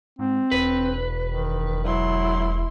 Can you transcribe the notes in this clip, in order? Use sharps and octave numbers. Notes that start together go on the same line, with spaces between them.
G#2 C4
E1 B4
D#3
F#3 E4 C6